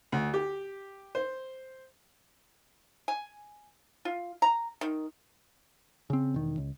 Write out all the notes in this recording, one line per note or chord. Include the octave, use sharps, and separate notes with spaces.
D2
G4
C5
G#5
F4
A#5
D#3
C#3 C4
E1 D#3
C#2